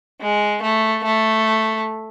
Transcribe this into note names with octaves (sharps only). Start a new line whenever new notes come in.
G#3
A3
A3